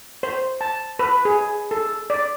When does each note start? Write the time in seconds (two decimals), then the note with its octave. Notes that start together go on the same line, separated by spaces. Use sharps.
0.23 C5
0.61 A5
0.99 B4
1.25 G#4
1.71 A4
2.10 D5